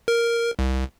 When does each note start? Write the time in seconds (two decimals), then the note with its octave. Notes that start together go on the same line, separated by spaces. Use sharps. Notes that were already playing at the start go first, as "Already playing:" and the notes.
0.08 A#4
0.59 C2